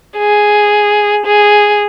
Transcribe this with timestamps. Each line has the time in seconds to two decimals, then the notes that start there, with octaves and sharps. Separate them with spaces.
0.18 G#4
1.26 G#4